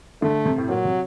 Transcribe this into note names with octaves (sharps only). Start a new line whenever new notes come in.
D3 A3
C3
A2
A#2 F#3
C3